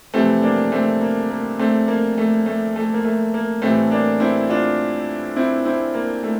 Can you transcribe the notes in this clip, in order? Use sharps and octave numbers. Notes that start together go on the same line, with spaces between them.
F2 C3 E3 G3 A3 C4
A#3 D4
A3 C4
A#3
A#3
A3 C4
A#3
A3
A3
A3
A#3
A3
A#3
A2 E3 G3 A3 C4
A#3 D4
C4 E4
D4 F4
C4 E4
C4 E4
A#3
A3